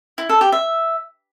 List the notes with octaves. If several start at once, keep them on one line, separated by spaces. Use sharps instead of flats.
E4
A4
G4
E5